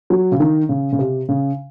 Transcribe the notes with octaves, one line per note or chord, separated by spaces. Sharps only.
F#3
C#3
D#3
C#3
C#3
C3
C#3